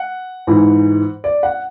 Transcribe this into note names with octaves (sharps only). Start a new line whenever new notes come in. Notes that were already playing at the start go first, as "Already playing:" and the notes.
Already playing: F#5
G#2 E3
D5
F#5